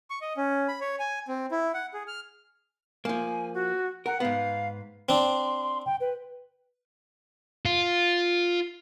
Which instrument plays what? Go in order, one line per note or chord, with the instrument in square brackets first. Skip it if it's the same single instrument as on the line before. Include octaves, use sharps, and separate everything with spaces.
[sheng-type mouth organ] C#6
D#5
C#4
B5
C#5
G#5
C4
E4
F#5
G#4
F6
[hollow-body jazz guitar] F3 A#3 [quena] G#5
[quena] F#4
[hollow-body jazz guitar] A#4 [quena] F#5
[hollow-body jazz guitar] G#2 B3 [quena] F5
[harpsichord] C4 D4 [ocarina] C6
[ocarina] G5
B4
[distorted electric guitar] F4